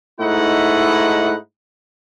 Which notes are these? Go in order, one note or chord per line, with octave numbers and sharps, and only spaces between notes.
G#2 A3 D#4 E4 F#5 B5